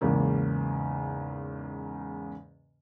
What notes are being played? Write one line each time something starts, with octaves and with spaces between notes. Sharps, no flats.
E2 G#2 C#3 A#3